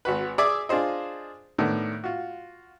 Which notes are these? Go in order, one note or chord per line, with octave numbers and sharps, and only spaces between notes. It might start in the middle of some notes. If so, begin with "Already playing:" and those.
G#1 F#4 B4
G#4 D5 E5 G#5 D6 D#6
D4 F4 G#4 C5 D#5
A2 D#3 B3 D4
F4 F#4